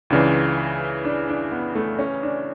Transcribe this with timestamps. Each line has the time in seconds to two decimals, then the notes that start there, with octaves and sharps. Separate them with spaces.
0.10 C#2 C#3 E3 D4
1.05 D4
1.29 D4
1.52 B3
1.76 A3
1.99 C#4
2.23 D4